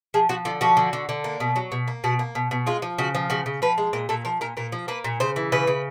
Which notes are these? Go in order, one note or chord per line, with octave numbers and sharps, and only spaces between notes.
F3 G#4
F3 F#4
D3 F4
F3 F#4
D3
D3
D3
A#3
B2
F#3
B2
A#3
B2 F#4
A#3
B2
B2
G#3 F4
F3
C#3 F#4
F3
C#3 F#4
C#3
F3 B4
G#3
A#2 A#4
A#2 A4
F3 A#4
A#2 A#4
A#2 A#4
F3
A#3 B4
A#2
C#3 C5
E3
C#3 B4
C#3